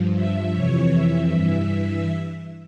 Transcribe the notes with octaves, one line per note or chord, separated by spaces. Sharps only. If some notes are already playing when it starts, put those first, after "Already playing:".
Already playing: G2 F3
E5
F2 C3 E3 C#5
E5
G2 E3